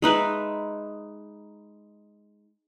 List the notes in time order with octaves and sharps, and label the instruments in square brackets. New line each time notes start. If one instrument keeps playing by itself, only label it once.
[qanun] G#3 D#4 B4 E5